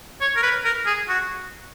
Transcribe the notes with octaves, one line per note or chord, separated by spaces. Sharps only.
C#5
A#4
B4
A#4
G#4
F#4